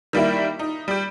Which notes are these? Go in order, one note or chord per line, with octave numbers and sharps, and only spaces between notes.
D#3 G3 A#3 E4
D#4
G3 G4